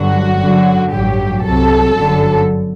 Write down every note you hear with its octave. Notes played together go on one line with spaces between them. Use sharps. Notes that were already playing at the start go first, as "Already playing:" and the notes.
Already playing: G1 G2 D3 F#3 F#4
F#2 D3 F#3
A1 G2 F#3 G4
C2 C3 F#3 A4
G1 F#2 D3 F#3